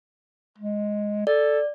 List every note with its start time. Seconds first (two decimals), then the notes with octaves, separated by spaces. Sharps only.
0.58 G#3
1.27 A4 D5